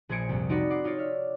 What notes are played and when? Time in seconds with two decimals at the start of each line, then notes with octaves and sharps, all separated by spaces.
0.09 A#1 G#4 C5 G#6 C#7 D7
0.29 C2 F2
0.49 C4 D#4 F#4 D5 B5
0.70 F#5 D6 C7
0.84 D#4 F4 C#5 D5
0.98 E5 F6